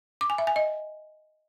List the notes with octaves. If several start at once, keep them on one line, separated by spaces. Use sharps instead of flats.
D6
G#5
E5
G#5
D#5